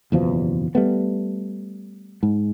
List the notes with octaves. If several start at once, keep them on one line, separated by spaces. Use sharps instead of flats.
F#1 E2 B2 F3
G3 A3 B3
G#2